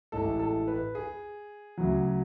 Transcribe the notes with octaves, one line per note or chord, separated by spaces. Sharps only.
A1 A2 G#3 A4
A4
B4
G#4
D2 C#3 F#3